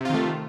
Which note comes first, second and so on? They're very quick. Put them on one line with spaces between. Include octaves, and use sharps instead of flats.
C3 F4 D#3 A3